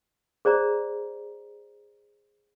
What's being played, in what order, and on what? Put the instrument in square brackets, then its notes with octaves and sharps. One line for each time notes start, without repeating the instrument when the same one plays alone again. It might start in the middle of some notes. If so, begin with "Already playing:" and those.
[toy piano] G#4 C5 D5 A#5